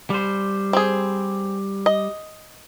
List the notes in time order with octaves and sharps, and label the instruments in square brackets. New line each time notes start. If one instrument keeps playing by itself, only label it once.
[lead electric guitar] G3 C5
[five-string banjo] C4 G#4
D#5